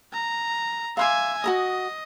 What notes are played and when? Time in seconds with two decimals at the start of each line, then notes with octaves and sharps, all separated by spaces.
0.13 A#5
0.97 E5 F5 G#5 C6 D6
1.44 F#4 A#4 D#5 D#6